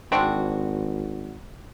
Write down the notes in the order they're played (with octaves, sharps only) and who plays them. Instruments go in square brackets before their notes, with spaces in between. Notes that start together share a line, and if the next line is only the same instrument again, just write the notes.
[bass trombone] G#1 [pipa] C4 D4 F#4